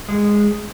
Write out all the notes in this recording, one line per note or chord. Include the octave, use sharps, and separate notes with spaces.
G#3